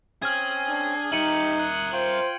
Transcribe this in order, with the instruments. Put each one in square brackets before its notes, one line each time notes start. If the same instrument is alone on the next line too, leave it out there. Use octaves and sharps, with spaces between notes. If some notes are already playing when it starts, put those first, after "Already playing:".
[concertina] C4 C#4 [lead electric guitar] G#4 [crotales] F6 G#6
[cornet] D4
[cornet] D#4 [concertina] G4 [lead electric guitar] A#4 E5 [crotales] C#7 D#7 F#7
[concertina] D#6 F#6
[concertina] F4 G5 [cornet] C5